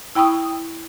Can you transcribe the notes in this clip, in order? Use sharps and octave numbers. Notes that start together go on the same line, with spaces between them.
E4 G5 B5 C#6 D#6